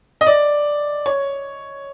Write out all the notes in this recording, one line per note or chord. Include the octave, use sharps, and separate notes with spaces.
D#5
D5
C#5